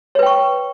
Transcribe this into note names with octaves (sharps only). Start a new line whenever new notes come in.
B4 C#5 G5 C#6